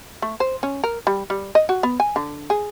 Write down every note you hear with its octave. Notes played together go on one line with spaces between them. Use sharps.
A3
C5
C#4
A#4
G3
G3
D#5
F#4
B3
G#5
D3
G#4